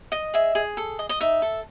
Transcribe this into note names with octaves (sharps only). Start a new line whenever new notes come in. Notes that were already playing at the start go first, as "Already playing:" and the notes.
D#5
G#4 E5
G#4
A4
D#5
D#5
D#4 E5
A4